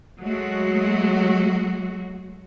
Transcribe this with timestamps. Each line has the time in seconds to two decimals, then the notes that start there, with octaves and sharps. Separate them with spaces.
0.20 F#3 G#3 A3 F#4